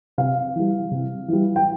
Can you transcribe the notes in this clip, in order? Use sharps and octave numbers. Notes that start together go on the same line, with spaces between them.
C3 F5
E3 G3
C3
E3 G3
G5